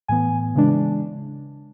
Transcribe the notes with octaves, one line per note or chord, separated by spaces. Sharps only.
A2 E3 B3 G#5
C#3 E3 G#3 D4